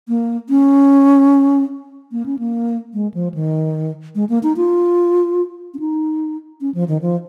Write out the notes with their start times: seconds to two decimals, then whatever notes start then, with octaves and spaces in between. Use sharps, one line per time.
0.08 A#3
0.49 C#4
2.12 A#3
2.26 C#4
2.39 A#3
2.94 G#3
3.14 F3
3.34 D#3
4.15 G#3
4.29 A#3
4.43 D#4
4.57 F4
5.74 C#4
5.80 D#4
6.61 C#4
6.75 F3
6.88 D#3
7.02 F3